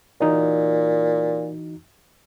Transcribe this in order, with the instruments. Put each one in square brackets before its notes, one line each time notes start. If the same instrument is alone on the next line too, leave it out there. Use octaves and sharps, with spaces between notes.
[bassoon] A#2 [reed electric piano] E3 D#4 F#4